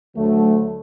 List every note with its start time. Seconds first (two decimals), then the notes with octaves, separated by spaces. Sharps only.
0.16 D2 D3 F#3 A3